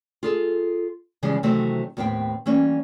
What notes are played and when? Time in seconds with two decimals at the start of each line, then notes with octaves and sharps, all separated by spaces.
0.23 F4 G#4 A4
1.23 C#3 E3 F3 G3 G#3
1.43 C3 D#3 E3 F#3 A3 C4
1.97 D#2 A2 B3 C4 G5
2.46 E3 G3 A#3 C#4